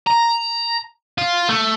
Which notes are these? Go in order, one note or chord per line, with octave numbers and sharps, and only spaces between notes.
A#5
F4
A3